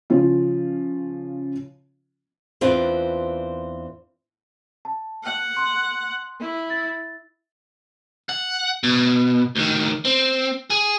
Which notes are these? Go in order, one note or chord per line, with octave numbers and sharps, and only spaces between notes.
C#3 F3 C#4 F4
E2 C4 D4 F4 B4
A5
F#5
C6
E4
A6
F#5
B2
D2 D#3
C4
G#4